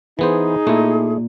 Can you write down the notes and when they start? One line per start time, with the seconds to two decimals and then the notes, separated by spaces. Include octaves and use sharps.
0.19 E3 B3 D#4 G#4 C5
0.67 A#2 A3 E4